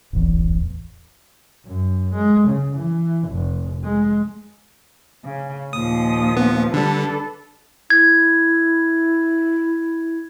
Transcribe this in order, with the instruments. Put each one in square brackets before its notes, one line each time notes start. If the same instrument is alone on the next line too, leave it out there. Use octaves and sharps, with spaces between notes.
[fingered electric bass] D1 A1 E2
[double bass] F#2
G#3
C#3
E3
F1
G#3
[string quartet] C#3
[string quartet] D#2 A#2 F3 [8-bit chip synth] D#6
[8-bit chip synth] B3
[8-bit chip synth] D3 G3 [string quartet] D4 A4 B4
[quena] E4 [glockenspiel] G#6